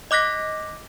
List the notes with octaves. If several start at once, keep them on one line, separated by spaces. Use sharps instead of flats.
D#5 D6 F#6 A#6 B6